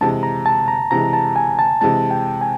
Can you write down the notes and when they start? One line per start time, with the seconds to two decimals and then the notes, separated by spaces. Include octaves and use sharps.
0.01 C3 E3 G#3 A5
0.23 A#5
0.46 A5
0.68 A#5
0.91 C3 E3 G#3 A#5
1.13 A5
1.36 G#5
1.59 A5
1.81 C3 E3 G#3 A5
2.11 G5
2.41 G#5